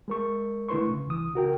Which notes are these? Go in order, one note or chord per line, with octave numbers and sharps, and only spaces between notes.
G#3 A#4 C#6
D3 A3 E4 B4 C6 C#6
C#3
C2 E3 D#6
C#3 F#4 A#4 G5